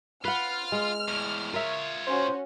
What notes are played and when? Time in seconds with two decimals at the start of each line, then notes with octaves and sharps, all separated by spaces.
0.25 F4 B4 F#5 F6
0.72 G#3
1.08 E2 A2
1.54 F4 A#4 C#5 E5
2.07 C#4 F#4 C5